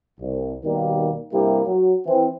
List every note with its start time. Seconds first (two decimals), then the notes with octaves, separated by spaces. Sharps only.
0.20 C2
0.64 D#2 B2 D#3 G3 A#3
1.32 G2 C3 G3 A#3 E4 G4
1.66 F#3
2.07 E3 C4